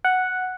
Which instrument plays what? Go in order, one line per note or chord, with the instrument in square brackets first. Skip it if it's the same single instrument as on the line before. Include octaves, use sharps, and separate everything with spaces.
[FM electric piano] F#5